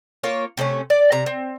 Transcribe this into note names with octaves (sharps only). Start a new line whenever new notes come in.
A#3 F4 C#5
C3 A3 C4 C#4
D5
C3 A#5
C4